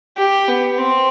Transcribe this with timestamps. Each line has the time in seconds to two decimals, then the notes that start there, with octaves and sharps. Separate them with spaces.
0.18 G4
0.48 B3
0.78 C4